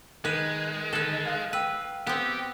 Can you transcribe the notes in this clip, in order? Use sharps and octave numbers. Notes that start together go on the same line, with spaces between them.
D#3 G#3 B4
D3 D#3 A4 B4
F5 F#6
B4 G5 E6 D#7
B3 C4 G4